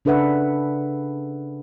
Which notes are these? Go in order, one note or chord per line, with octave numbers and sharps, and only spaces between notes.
C#3 D4 A4 B4 E5 F#5